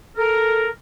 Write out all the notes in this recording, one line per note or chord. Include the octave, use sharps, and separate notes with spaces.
A4 A#4